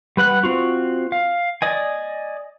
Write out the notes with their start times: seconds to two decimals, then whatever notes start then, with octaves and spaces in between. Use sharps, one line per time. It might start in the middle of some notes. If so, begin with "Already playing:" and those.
0.17 G3 B4 F#5 F#6
0.43 C4 F4 F#4
1.12 F5
1.62 D5 D#5 G#5